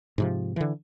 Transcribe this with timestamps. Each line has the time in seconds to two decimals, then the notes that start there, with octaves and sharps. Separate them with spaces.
0.18 G#2 C3 F3
0.56 D3 E3